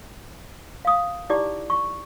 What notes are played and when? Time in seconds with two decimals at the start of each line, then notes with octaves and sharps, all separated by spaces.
0.85 F5 D#6
1.30 D#4 E4 G4 D5 D6
1.70 C#6